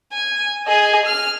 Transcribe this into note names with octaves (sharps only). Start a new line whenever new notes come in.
G#5
G#4 D#5
F6